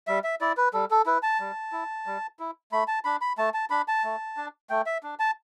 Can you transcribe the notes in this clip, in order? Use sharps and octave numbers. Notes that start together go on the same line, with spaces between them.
G3 E5
E5
E4 D5
B4
G3 A4
A4
E4 B4
A5
G3
E4
G3
E4
A3 B5
A5
D4 B5
B5
A3 A5
A5
D4 B5
A5
A3
D4
A3 G5
E5
D4
A5